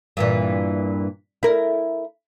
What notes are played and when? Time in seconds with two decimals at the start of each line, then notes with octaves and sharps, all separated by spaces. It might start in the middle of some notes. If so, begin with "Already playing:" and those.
0.17 G2 A#2 E3
1.43 E4 A#4